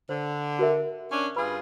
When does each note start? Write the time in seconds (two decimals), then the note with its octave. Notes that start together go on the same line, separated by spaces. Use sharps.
0.09 D3 C5
0.59 F#4 A#4 E5
1.10 C#4 D4
1.36 G2 F4 G#4 B4 B5